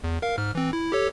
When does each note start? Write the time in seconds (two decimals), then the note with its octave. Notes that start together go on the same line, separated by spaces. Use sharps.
0.04 E2
0.22 A#4 F5
0.38 G#2 F6
0.55 E3 C4
0.73 E4
0.92 G4 A4 C#5